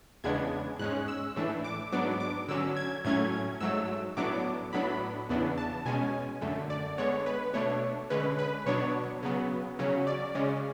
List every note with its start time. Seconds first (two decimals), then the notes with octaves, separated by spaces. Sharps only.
0.24 E2 C#3 G#3 B3 D4 G#6
0.79 G#2 G#3 C#4 F#6
1.08 E6
1.36 A2 E3 A3 D4
1.64 D6
1.92 G#2 F#3 B3 D4 D6
2.20 D6
2.48 D3 F#3 C#4 E6
2.77 G#6
3.05 A2 F#3 A3 C#4 G#6
3.61 G#2 F#3 A3 E6
4.17 A2 F#3 B3 D4 D6
4.73 A2 F#3 B3 D4 B5
5.29 E2 C#3 E3 B3 D4
5.58 A5
5.85 B2 G#3 C#4 G#5
6.42 F#2 D3 A3
6.70 D5
6.98 D3 G#3 B3 C#5
7.26 B4
7.54 B2 A3 D4 C#5
8.10 D3 G#3 C#4 B4
8.39 B4
8.66 B2 F#3 B3 D4 C#5
9.23 C#3 F#3 B3
9.79 C#3 F#3 C#4
10.07 D5
10.35 C#3 G#3 C#4